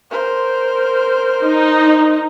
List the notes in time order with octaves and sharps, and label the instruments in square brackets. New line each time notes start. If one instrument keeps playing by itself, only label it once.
[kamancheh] A#4 C5
[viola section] D#4